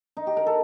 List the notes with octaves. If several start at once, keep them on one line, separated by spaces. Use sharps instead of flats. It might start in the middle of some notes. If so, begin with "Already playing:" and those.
D#4
G4
A#4
A4